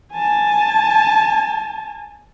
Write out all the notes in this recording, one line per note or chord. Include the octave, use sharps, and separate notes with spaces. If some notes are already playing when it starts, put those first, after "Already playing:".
G#5 A5